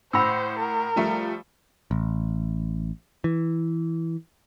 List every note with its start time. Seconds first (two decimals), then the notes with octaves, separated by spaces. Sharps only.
0.13 A2 C5 F#5 B5 E6 A#6
0.59 A#4
0.96 F3 G3 A3
1.91 A1
3.24 E3